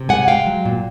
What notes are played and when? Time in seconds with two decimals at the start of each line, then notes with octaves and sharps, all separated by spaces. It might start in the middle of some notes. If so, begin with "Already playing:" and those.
Already playing: C3
0.09 G#3 F#5 G#5
0.27 G#3 F5 G5
0.46 F#3
0.65 A#2